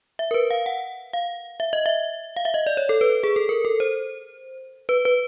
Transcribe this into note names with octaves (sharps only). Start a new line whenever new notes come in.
E5
A#4
B4
F5
F#5
F5
E5
D#5
E5
F5
E5
D#5
D5
C#5
A4
B4
G#4
A4
A#4
A4
C5
B4
B4